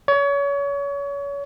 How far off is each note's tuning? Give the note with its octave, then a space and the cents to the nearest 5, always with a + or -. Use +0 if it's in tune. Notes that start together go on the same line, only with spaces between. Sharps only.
C#5 +30